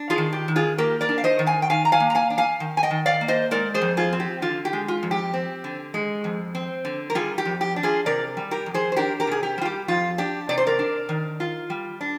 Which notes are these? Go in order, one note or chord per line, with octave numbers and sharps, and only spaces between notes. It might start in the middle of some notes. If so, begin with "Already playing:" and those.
Already playing: D4
F4 G#4
D#3
G4
D#3
F4 G#4
A#3 G4 A#4
A#4 D5
D4
F5
C5 D#5
D#3
F5 G#5
G5
D#3 F5 G#5
A#5
F5 G#5
A#3
A#5
F5 G#5
D4
F5 G#5
D#3
G#5
D#5 G5
D#3
D5 F5
A#3
C5 D#5
G#3 A#4 D5
G#4 C5
F2
F4 G#4
C4
G4
D3 F4
G4
G#3
F4
F2
G4
C4
D3
G#3
F2
C4
D3
A#4
G3 F4 G#4
G4
F2
G4
D4
F4 G#4
C3 A#4 D5
G3
G4 A#4
F2
G#4 C5
C5
D4 G4 A#4
G4 A#4
C3 G#4
G4
G3 F4
G4
F2 F4
D4 G4
C3 D5
C5
A#4 D5
D4
D#3
F4
G3
D4